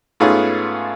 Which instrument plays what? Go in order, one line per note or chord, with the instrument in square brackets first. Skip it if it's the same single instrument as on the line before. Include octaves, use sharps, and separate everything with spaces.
[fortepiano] G#2 A3 B3 C#4 F4 G#4